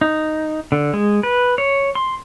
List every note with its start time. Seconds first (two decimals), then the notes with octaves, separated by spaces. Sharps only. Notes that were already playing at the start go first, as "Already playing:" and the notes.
0.01 D#4
0.72 D3
0.94 G#3
1.23 B4
1.58 C#5
1.95 C6